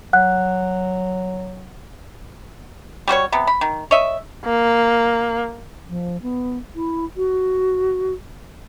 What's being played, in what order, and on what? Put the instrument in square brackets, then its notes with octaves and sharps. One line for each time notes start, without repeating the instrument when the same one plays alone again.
[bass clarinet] F#3 [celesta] F#5 F#6
[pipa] G3 F#4 C5 C#5
C3 B3
B5
D#3
C#5 D#5 E5
[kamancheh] A#3
[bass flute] F3
B3
E4
F#4